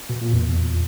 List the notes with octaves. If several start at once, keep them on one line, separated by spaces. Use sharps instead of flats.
B2
A#2
E2